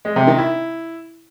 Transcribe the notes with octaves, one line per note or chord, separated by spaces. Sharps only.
G#3
C3
D#3
E4